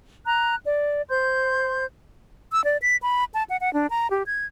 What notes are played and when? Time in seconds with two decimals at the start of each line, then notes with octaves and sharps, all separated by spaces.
0.25 A#5 F#6
0.64 D5
1.09 C5 C6 G6
2.52 E6
2.64 D5
2.82 B6
3.02 B5
3.34 A5
3.50 F#5
3.61 F#5
3.74 D4
3.90 A#5
4.10 G4
4.26 G#6